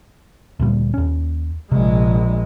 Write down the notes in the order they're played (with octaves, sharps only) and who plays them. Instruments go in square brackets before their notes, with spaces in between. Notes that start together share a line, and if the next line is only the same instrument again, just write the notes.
[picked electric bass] D2 A#2 G3
D#2 C#4
[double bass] A#1 G#3 [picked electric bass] C3